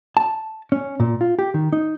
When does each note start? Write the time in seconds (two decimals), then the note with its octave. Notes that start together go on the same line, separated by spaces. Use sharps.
0.17 A5
0.72 C#4
1.00 A#2
1.21 F4
1.39 G4
1.54 D#3
1.73 D#4